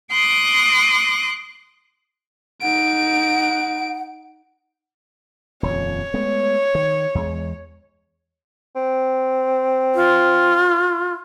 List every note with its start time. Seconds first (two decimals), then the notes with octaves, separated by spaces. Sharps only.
0.12 C6 D6 D#6 F#6 A#6
2.62 D#4 F#5 D7
5.63 D#1 F2 C#5
6.14 G#3 A3 B3
6.75 D#3
7.15 E2 G#3
8.76 C4
9.95 F4